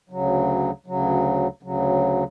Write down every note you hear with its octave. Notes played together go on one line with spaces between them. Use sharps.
D2 C#3 F#3
D2 C#3 F#3
D2 C#3 F#3